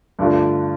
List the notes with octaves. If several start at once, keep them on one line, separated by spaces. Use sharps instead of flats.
G2 D3 A3 D4 F4